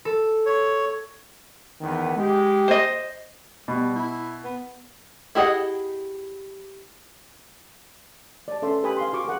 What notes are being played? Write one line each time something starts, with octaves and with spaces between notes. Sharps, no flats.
A4
C#5
E2 D#3 B3
G#3 G4
C5 D#5
B2 G3
E4
B3
E4 G4 G#4 D#5 F#5
D5 A5
C#4 A4 B4 E5 C6
G4 B4 G5 G#5 B5 D#6
F5 C6
F#4 G#4 F5 C#6 D6
G#4 A#4 F#5